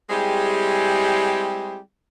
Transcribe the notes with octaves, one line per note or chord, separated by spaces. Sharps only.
G3 G#3 C4 E4 G4 G#4